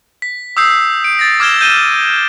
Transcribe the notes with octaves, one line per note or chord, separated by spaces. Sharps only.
B6
D#6 E6 G6 C7
D7
A6 A#6
D6 F6 G#6 E7 G7
G6 D#7 E7 G7